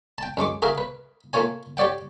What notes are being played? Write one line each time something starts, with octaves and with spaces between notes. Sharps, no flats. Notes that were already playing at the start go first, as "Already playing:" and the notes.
G5 A5
F#2 G#3 C#6 D6
F#4 G#4 A#4 E5 F5
B4
A3 A#3 F4 C#5 G#5
G4 C#5 D5 F#5 G5